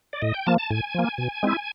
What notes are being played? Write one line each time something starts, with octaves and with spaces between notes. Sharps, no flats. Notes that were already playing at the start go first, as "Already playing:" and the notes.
D5
A2 D#5
G5
F3 A#3 A5
A5
A2 G#5
F3 A#3
B2
G#3 C4 E4